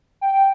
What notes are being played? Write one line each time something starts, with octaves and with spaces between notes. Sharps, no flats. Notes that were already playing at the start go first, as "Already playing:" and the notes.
G5